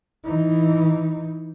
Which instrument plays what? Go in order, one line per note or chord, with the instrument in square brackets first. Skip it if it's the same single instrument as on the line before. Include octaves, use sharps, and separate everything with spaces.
[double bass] E3 D#4